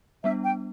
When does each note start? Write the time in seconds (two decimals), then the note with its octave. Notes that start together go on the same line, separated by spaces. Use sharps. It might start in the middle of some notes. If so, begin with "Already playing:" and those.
0.24 G3 B3 D4 E5
0.44 G5